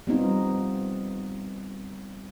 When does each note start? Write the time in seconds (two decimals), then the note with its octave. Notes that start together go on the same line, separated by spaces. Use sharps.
0.07 G3 B3 C4 D#4 F4